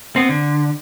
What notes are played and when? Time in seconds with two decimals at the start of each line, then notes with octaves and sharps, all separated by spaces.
0.16 B3 C4
0.29 D3